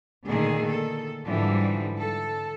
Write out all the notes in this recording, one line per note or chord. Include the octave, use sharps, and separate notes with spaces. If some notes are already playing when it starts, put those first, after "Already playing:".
A#2 D3 D#3 A3 G#4
A4
G#2 D3 E3 F3 G3
A4